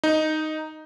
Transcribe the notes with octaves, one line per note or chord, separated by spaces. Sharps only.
D#4